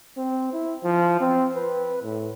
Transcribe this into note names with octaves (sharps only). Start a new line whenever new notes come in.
C4
E4
F3
C4
B4
A2